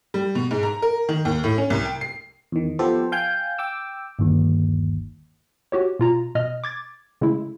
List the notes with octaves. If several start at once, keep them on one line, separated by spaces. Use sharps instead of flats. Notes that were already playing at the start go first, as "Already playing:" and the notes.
G3
B2
G#2
A#5
A#4
D#3
D#2
A2
C#4
C2
G5
C7
E2 D#3
F3 B3 G4 A4 C5
F5 G5 G#5 G6
G5 D6 E6
G1 D#2
F#4 G4 C#5
B2 F4 A#5
B2 D#5 F6
D6 G#6 A6
C#3 G#3 A3 E4